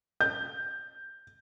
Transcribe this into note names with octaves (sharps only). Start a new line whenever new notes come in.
G6